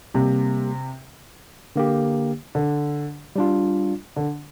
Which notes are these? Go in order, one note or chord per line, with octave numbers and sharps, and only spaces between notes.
C3 G3 A#3 G4
D3 A#3 G4
D3
G3 D4 F4
D3